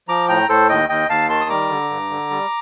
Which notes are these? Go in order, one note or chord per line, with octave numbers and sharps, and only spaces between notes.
F3 A#5 D6
A2 G5 A#5
A2 A4 C5
D#2 D#5 G5
D#2 D#5 G5
D#2 F5 A5
D#3 A5 C6
D#6
G3 A#5 D6
D3
G2
D3
G3